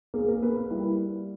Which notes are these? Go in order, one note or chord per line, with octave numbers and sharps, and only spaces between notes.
A#3 G#4
A#4
A#3 B4
B4
G3 E4